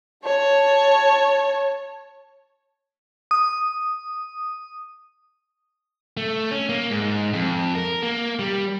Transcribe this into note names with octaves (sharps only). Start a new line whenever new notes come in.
C#5 A5
D#6
A3
C#4
A#3
G#2
F2
A#4
A#3
G3